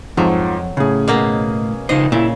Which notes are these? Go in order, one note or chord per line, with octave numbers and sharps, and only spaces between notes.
F2 G#2 F3 F#3
A2 C#3 C#4 G#4
B2 A#3 D#5
C#3 D#4 C5 D#5
A#2 C#3 E4